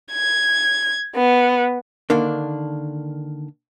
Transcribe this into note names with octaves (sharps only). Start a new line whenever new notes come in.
G#6
B3
D3 D#3 A#3 D4